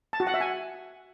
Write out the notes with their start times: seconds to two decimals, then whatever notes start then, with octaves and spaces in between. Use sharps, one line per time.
0.13 A5
0.20 F#4
0.27 F#5
0.34 E5
0.41 G#5